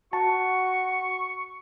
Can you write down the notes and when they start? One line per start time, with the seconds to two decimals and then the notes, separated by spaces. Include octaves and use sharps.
0.13 F#4 A5 C#6